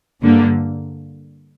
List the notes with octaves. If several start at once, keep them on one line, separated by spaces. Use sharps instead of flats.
G2 D3 A#3